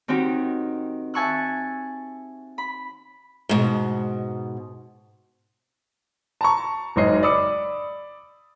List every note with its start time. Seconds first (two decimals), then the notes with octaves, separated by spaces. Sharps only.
0.08 D#3 C4 D#4 F#4 G4
1.14 E5 G#5 A5 C#6 E6 F#6
2.58 B5
3.49 G#2 B2
6.41 A5 A#5 C#6
6.96 F#1 G#2 C#5 D#5 C7
7.23 D5 B5 D#6 E6 C#7